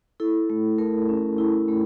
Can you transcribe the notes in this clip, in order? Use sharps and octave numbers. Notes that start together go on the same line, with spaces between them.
E4 A4
A3
A3 A#4
C#4
E4
A3